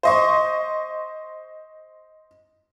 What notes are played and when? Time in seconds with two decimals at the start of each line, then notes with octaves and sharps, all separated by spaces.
0.03 C5 D#5 C#6